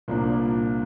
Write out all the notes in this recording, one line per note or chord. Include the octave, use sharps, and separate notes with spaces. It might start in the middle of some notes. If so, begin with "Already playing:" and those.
C2 A#2 F3 A#3 D4